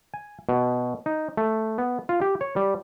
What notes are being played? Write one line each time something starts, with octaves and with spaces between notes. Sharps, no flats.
G#5
B2
D#4
A3
B3
F4
G4
C#5
G3